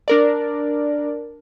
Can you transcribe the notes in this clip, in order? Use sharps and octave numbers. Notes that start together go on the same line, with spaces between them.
D4 A#4 D5